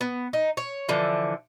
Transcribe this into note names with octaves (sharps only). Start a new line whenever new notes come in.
B3
D#4
C#5
D3 E3 F3